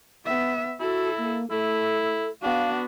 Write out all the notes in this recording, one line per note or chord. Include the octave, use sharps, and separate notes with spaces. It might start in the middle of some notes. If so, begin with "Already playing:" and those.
B3 E5
E4 F#4 A4
A#3
A3 E4 A4
B3 D4 F#4 F5